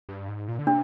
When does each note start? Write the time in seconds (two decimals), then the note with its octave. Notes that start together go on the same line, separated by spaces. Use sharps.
0.09 G2
0.28 G#2
0.48 A#2
0.59 D3
0.67 C3 D4